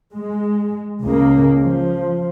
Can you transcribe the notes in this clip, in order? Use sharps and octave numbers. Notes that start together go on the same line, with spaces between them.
G#3
C#2 C#3 A#3
F3